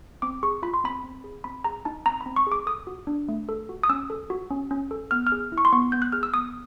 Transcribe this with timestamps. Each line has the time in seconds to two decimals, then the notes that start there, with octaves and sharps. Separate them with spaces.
0.22 C4 D6
0.43 G#4 C#6
0.63 F4 B5
0.74 C6
0.84 C4 B5
1.04 C4
1.24 G#4
1.44 C4 B5
1.64 G#4 A#5
1.85 D#4 A5
2.06 C4 A#5
2.21 B5
2.26 C4
2.36 C#6
2.47 G#4 D6
2.66 A4 D#6
2.87 F#4
3.07 D4
3.28 A3
3.49 A4
3.69 F#4
3.83 D#6
3.89 C#4 E6
4.10 A4
4.30 F#4
4.51 C#4
4.71 C#4
4.91 A4
5.11 B3 F6
5.27 F6
5.32 G#4
5.52 E4
5.58 C#6
5.65 C6
5.73 B3 C#6
5.92 B3 G6
6.02 F#6
6.12 G#4 F6
6.23 E6
6.34 B3 D#6